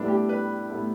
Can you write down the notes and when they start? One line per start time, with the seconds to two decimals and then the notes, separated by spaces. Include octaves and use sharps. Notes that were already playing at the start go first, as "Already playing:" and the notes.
Already playing: A2 G3 B3 D4 E4 A4
0.08 G4
0.29 B4
0.70 A2 G3 B3 E4 A4